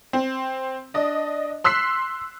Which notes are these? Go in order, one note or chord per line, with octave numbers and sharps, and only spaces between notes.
C4
D4 D#5
C6 E6 F#6 B6 C7